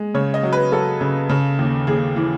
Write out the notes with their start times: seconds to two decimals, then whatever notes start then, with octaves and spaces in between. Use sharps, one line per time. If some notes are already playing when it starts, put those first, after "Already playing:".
Already playing: G#3
0.14 C#3 C#5
0.34 D#5
0.43 F#3
0.53 B4
0.72 F#3 A4
1.01 C#3
1.30 C#3
1.59 D#2
1.87 D#2 G#4
2.16 E3